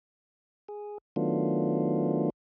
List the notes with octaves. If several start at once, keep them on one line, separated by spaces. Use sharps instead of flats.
G#4
D#3 F#3 A3 B3 D4 F4